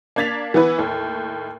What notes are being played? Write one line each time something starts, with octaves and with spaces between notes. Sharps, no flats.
A#3 D4 G#6 A6 B6 F7
E3 B3 E4 B4
D#2 A2